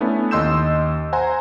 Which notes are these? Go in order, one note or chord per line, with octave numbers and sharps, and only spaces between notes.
A3 B3 C#4 D4 E4
D#2 D#5 C6 E6 G6 E7
C5 F#5 G#5 A#5 C6